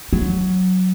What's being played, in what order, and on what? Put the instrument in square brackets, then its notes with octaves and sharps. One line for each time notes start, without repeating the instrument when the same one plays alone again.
[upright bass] F#3